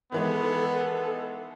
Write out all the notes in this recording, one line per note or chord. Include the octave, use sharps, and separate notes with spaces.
D#3 E3 G#3 B3 A4